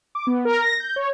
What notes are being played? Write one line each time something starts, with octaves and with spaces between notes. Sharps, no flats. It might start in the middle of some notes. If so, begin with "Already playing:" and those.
D6
B3
A#4
A#6
G6
C#5